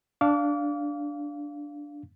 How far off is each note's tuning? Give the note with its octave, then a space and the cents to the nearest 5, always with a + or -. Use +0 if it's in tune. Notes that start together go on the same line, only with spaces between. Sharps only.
D4 -5 F5 +0 D6 -35